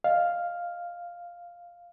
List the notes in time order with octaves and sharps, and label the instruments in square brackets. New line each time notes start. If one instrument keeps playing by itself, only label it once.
[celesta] D#5 [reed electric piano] F5